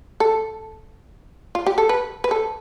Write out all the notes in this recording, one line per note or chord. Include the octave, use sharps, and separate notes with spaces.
A4
F4
G4
A4
B4
B4
A4